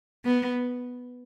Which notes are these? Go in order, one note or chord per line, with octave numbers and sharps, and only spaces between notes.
B3